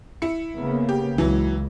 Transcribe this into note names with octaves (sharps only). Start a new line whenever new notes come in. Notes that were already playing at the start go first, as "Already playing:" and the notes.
E4 C#7
C#3 A#3 B3
G4
C#2 E3 F#3